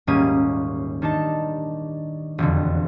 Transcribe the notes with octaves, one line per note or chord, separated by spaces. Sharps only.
D#1 G#2 G3 A#3 C#4 D#6
D#3 D4 D#4 A5
E1 F2 D3